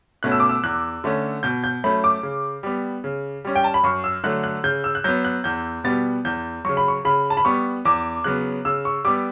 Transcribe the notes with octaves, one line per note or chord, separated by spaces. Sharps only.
B2 A3 C#4 F#6
E6
D6
E6
E2 F#6
D3 A3 C#4
B2 G6
G6
F#3 A3 C#4 B5
D6
C#3
G3 B3
C#3
G3 C#4
G5
A5
B5
F#2 C#6
E6
D3 F#3 A3 F#6
F#6
C#3 G6
E6
F#6
F#3 B3 G6
F#6
E2 G6
B2 G3 B3 A6
E2 G6
C#3 F#3 C#6
B5
C#6
C#3 B5
A5
B5
G3 B3 C#6
E2 D6
C#3 F#3 B3 F#6
C#3 E6
C#6
G3 B3 D6